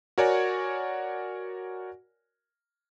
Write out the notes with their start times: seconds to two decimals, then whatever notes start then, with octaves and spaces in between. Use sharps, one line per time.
0.18 F#4 A#4 C#5 D5 F#5 G#5